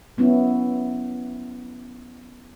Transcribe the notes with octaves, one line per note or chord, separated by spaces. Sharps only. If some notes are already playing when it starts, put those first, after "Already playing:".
F#3 B3 C#4 E4